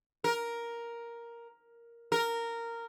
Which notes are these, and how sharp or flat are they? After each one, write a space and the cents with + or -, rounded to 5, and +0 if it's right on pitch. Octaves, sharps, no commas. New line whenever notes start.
A#4 +5
A#4 -10